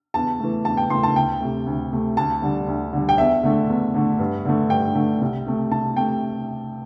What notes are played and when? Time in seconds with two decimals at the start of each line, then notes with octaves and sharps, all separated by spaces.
0.14 E2 A5
0.40 E3 A3
0.65 E2 A5
0.77 G5
0.90 E3 A3 C6
1.03 A5
1.16 D2 G5
1.41 C3 A3
1.67 D2
1.92 C3 A3
2.17 D2 A5
2.42 D3 G3
2.68 D2
2.93 D3 G3
3.09 G5
3.18 E2 E5
3.43 D3 A3
3.69 E2
3.94 D3 A3
4.19 G2
4.45 D3 A3
4.70 G2 G5
4.95 D3 A3
5.21 C2
5.46 C3 A3
5.71 C2 A5
5.97 C3 A3 G5